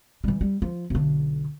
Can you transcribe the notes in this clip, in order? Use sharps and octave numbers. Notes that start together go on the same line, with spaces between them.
E3 G3
G3
F3
B1 D3